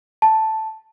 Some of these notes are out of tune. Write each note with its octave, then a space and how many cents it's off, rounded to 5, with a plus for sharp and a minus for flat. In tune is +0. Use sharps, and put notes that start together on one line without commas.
A5 +0